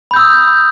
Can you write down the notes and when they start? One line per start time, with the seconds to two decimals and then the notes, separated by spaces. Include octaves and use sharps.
0.11 B5
0.14 G6
0.16 E6
0.19 D#6